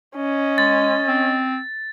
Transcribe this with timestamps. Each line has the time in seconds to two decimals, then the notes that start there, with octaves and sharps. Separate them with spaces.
0.16 C#4 D#5
0.58 G#3 A6
1.08 C4